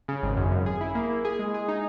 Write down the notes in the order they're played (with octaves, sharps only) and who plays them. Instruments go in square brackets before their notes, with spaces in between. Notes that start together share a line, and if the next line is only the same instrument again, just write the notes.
[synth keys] C#3
G#1
F#2
F#2
G#4
E4
A#3
E4
G#4
G#3
G#4
D#4